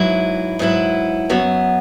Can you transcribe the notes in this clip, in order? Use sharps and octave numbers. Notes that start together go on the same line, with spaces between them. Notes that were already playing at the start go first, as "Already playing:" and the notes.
Already playing: G#2 F#3 E4 B4
G#2 F#3 E4 B4
F#2 F#3 B3